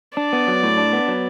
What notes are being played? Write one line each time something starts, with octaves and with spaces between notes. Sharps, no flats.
D4 D5
B3
F#3
A2
D4
B3
F#3